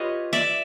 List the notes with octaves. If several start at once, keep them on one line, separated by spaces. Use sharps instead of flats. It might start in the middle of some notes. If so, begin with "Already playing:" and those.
Already playing: F4 G4 B4 C#5 D#5
D5 E5